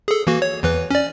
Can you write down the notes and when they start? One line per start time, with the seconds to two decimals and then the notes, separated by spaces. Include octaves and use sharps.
0.08 G#4 A4
0.27 E3 A#3 F#4
0.42 C#5
0.63 E2 E3 B4
0.91 C#4 D5